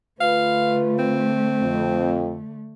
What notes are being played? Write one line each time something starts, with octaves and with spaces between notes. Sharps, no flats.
D3 A3 F4 B4 F5
C4
F2